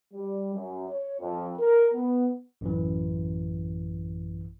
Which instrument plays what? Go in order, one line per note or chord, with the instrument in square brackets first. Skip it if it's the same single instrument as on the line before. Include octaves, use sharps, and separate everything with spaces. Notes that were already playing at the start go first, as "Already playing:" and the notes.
[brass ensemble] G3
F#2
C#5
F2
A#4
B3
[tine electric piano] A1 F#2 E3